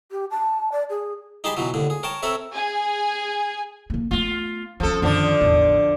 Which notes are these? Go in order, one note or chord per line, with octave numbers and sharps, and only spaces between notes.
G4
A5
D5
G#4
D#4 G4 G#4 A5 B5 C6
B2 E3 F#3
D#2 A2 D3
G#4
A#4 C#5 G5 A5
C4 A4 A#4 C#5 E5
G#4 G#5
C#3 A#3
A3 B3 F4
F3 G3 C#4 A4
F#2 D3 D#3 F3 D4
A1 E2